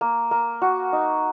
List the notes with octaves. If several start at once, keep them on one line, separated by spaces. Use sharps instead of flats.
A#3
A#3
F#4
D#4